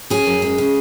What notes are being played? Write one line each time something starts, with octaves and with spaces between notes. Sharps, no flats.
C#4 G#4
F#2
G#3
C#3